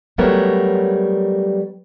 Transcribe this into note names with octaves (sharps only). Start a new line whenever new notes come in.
F#3 G3 A3 B3 A#4 C#5